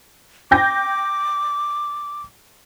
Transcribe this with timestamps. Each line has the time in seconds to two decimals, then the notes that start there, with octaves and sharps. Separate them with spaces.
0.51 G5 D6 G6 A#6